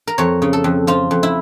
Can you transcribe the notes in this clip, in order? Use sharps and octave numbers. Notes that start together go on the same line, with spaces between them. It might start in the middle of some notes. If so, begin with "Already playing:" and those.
A#4
F2 C#5
C#3
A4
F2
F3 F4
F2
E4